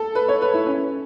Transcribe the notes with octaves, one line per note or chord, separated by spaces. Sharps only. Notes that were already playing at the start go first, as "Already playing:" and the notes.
Already playing: A4
B4
C#5
B4
E4
C#4